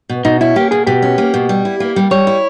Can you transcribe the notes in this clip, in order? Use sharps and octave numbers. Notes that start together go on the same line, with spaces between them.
B2
B2 D#4
C#4 E4
A#3 G4
B2 G#4
B2 G4
C#4
A#3
B2
G3
E4
A#3
G3
G3 C#5
E4